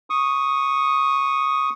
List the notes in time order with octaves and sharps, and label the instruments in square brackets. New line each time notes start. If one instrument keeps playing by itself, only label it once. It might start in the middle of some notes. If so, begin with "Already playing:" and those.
[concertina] C#6 D#6